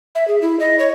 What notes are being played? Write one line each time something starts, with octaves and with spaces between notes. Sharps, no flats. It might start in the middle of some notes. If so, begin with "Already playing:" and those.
E5
G#4
E4
D#5
C#5